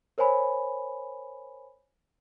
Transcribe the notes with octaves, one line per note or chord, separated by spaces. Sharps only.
A#4 C5 C#5 G#5 B5